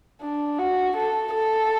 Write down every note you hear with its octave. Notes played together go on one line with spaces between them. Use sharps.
D4
F#4
A4
A4